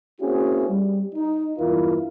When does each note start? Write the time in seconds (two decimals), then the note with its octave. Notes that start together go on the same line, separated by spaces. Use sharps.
0.21 A#3 C4 C#4 E4 F#4 G#4
0.69 G3
1.15 D#4
1.59 E2 G2 E4 F4 A#4